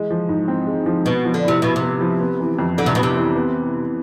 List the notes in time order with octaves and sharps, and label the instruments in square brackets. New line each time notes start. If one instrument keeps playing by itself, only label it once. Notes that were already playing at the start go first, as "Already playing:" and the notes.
Already playing: [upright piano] E3 G#3
F3
G#2
C4
G#3
F3
[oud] B2 [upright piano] B3
[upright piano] F3
[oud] D3
[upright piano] A2 [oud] C3
[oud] B2 [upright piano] E4
[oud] C3
[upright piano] B3
F3
B3
E3
F2
[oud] D3 [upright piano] D4
[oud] C3
[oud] B2 [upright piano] B3
[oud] C3
[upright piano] E3
B3